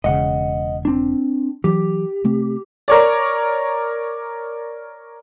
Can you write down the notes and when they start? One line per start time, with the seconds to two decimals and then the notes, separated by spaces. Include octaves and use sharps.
0.04 E1 C#3 D#5 F#5
0.85 C4 D4
1.64 E3 F#3 G4
2.24 C3 A3 C4
2.88 A#4 C#5 D5